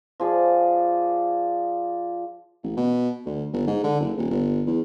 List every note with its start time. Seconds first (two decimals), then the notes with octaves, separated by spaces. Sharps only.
0.20 F3 G#4 D5
2.63 A1
2.77 B2
3.25 D2
3.53 G1
3.67 G#2
3.83 D3
4.00 F#1
4.17 D#1
4.30 G1
4.66 E2